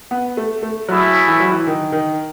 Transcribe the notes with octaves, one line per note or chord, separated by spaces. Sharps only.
B3
A3
A3
F#3 A3 C#4 E4 G#4
E3
F#3
E3
D#3
D#3